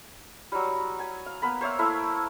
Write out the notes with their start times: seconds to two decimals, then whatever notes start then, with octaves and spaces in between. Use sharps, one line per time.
0.52 F#3 G3
0.99 G#5
1.26 F5
1.42 A#3 B3 B5
1.61 C5 C#5 E5 F5
1.79 A3 A#3 E4 E5